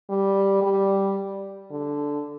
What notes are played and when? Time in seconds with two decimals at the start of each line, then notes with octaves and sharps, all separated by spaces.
0.09 G3
0.63 G3
1.71 D3